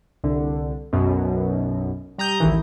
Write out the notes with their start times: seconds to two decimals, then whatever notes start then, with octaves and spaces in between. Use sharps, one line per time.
0.24 C2 D3
0.93 B1 F#2 B2
2.18 G3 A#5 D#6 G6
2.40 A1 D2 D#3 E3